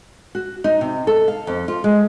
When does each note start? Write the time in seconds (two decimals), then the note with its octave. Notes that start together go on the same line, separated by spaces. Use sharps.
0.35 F#4
0.64 D#4
0.81 C3
1.07 A4
1.28 F5
1.47 F2
1.68 F4
1.84 G#3